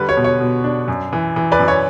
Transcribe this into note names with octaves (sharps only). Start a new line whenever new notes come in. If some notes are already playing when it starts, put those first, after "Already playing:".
Already playing: D3 G3 B4
C#5
B2
C#5
B2
D4
F#2
E3
E3
B4 D5
F#2
C#5